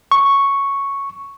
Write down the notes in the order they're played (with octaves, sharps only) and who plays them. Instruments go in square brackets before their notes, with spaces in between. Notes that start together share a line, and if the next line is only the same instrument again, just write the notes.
[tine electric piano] C#6